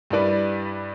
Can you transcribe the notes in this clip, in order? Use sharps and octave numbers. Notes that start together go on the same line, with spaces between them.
G2 G3 E4 B4 D5